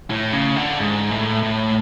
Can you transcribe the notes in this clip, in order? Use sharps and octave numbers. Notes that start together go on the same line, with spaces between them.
A2
C#3
D3
G#2
A2
A2